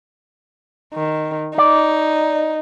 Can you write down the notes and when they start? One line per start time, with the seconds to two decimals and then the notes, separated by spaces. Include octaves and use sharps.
0.94 D#3
1.58 D#4 D5